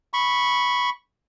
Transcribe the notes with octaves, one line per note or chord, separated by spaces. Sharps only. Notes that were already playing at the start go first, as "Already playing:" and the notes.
B5 C#6